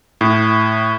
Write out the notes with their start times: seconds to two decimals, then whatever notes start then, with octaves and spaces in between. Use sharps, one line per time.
0.21 A2